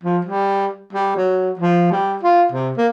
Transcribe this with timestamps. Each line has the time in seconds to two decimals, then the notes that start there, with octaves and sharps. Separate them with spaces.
0.04 F3
0.25 G3
0.93 G3
1.17 F#3
1.59 F3
1.92 G3
2.23 F4
2.52 C3
2.77 A#3